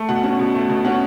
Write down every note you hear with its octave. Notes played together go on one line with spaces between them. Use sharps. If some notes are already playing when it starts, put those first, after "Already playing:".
Already playing: A3
B2 F#5
C#4 F#5
B2
A3
B2
C#4 F#5